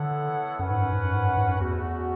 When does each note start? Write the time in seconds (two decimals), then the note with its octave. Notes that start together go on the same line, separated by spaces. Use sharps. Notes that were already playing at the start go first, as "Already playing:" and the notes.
Already playing: D3 B3 E4 A4 C#5 F#5
0.59 F#2 C#4 F#4 B4 F#5
0.71 G#2
0.82 F#2
0.93 G#2
1.04 F#2
1.15 G#2
1.26 F#2
1.37 G#2
1.48 F#2
1.60 E2 A3 C#4 F#4